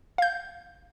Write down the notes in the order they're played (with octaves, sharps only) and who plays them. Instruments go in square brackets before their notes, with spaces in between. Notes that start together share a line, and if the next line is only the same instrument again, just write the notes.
[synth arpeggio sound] F5 G6